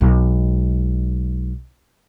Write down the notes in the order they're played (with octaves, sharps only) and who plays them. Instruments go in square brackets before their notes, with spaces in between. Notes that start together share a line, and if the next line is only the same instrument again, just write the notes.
[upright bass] B1 G#3